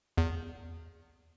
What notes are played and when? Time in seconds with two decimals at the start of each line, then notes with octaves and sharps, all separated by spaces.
0.18 E2